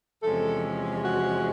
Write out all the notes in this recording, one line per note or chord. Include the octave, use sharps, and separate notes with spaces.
E2 C3 F3 G#3 C#4 A4
F#4